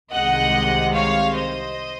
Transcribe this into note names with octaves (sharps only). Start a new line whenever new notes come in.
C2 C3 D#3 G#3 D#5 F#5
C#5 F5
C5 D#5